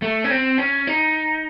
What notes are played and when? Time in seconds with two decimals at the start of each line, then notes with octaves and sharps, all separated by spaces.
0.02 A3
0.24 C#4
0.30 C4
0.58 C#4
0.87 D#4